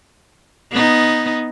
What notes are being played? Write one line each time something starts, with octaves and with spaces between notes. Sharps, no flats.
B3 D#4